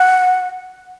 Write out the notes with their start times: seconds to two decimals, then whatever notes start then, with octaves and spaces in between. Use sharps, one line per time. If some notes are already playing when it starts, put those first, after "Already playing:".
Already playing: F#5